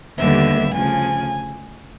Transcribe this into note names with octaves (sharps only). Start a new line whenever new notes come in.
D#2 D3 G3 B3 E5
D2 C#3 F3 G#5